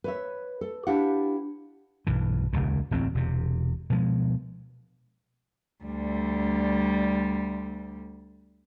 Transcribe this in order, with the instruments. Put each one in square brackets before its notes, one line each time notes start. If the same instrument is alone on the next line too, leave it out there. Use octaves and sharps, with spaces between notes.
[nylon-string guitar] B4 C#5 E5
A4
D4 E4 G4 F5 F#5
[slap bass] B1 G2 E3
D#1 G#1 C#2 A#2
D1 A1 E2 C4
E1 C3
B2 F3 G#3
[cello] D2 G3